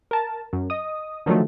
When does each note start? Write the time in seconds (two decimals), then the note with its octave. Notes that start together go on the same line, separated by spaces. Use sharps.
0.11 A#4 A5
0.53 F#2
0.70 D#5 D#6
1.26 D3 D#3 F3 F#3 A3